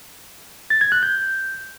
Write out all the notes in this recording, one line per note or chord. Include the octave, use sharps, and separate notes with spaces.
A6
G#6
F#6
G6